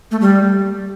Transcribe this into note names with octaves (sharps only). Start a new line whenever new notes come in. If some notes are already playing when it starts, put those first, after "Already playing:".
A3
G3